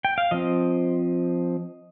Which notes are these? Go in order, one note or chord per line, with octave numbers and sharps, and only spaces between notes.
G5
F5
F3 C4 D#5